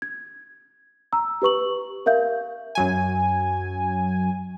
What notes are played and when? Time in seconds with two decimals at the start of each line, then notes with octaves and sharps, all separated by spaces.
0.02 G#6
1.13 A#5 E6
1.42 G4 B4 C#6 F#7
2.06 A#4 E5 F5 G6
2.75 F#2 F#3 G#5